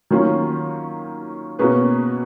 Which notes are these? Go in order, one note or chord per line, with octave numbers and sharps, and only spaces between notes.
D#3 F#3 A#3 C#4 F4
B2 A#3 C#4 G#4 B4